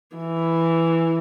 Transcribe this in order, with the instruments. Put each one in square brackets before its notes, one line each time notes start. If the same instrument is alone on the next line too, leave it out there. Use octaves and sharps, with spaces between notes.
[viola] E3